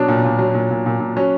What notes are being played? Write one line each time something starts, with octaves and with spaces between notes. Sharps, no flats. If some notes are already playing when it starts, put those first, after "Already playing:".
Already playing: B2 F#3 D4
A#2
A#2
F#3
A#2
A#2
A#2
A#2
F#3 C#4